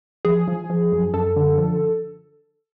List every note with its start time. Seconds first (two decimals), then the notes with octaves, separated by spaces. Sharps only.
0.25 F3 G#4
0.48 F3
0.70 F3
0.92 F#2
1.14 F#2 A4
1.36 D3
1.58 F3